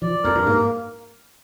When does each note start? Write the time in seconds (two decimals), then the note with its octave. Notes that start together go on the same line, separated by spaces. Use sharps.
0.02 F3 D5
0.24 F2 A#4
0.35 G2
0.46 G#2 A#3